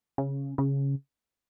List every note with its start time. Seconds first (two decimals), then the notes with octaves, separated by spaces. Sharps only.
0.18 C#3
0.58 C#3